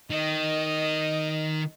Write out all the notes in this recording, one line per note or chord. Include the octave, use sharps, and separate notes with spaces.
D#3 D#5